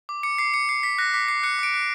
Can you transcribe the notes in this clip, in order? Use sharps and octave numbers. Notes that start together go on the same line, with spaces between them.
D6
D6 C#7
D6 C7
D6 C#7
D6 C7
D6 B6
F#6 A#6
D6 B6
D6 C7
F#6 C#7
D6 D7
F#6